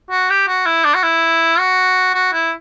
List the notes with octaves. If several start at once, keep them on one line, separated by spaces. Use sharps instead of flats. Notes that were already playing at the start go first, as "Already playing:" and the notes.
F#4
G4
F#4
E4
D4
F#4
E4
F#4
F#4
E4